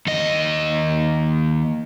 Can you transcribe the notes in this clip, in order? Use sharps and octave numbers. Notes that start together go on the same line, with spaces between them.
D#2 D#5